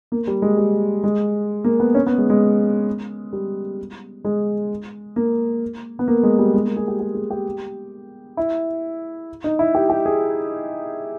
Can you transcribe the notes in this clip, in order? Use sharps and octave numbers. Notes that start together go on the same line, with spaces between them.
A#3
G3
G#3
G3
G#3
A#3
B3
C#4
B3
G#3
G#3
G3
G#3
A#3
B3
A#3
G#3
G3
G#3
A#3
G#4
G4
G4
G#4
G4
E4
D#4
E4
G4
G4
G#4